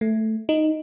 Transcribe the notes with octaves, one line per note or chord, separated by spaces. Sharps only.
A3
D#4